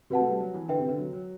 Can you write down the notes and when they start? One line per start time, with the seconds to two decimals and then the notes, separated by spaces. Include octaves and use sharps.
0.10 C3 F#4 B4 F#5 A5
0.20 A3
0.29 G3
0.40 F#3
0.54 E3
0.68 D3 B4 E5 G5
0.79 C3
0.89 D3
0.98 F#3
1.13 F#3